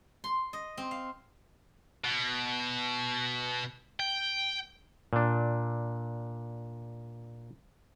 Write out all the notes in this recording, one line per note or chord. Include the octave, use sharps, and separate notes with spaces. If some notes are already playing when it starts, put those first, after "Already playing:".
C6
D#5
C4
F5
B2
G5
A#2 D4